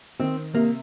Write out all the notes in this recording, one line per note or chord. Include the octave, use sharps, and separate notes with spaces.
D#3 C4
C3 A#3